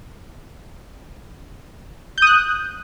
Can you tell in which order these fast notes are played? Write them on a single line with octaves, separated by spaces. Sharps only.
G6 D#6 F#6